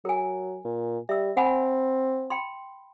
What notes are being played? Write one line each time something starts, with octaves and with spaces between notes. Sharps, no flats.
F#3 A#4 G#5
A#2
G3 E5 E6
C4 F#5 G#5 B5
G5 B5 C6